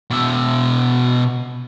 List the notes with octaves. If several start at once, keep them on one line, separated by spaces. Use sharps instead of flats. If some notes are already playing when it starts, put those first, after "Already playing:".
B2 E5